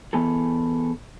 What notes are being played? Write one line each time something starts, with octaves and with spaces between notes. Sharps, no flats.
E3 B3 G#4 A4